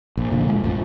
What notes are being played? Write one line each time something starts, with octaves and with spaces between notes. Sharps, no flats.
A#1
F1 A#2 D3
E1 G#3
A1 F2 F3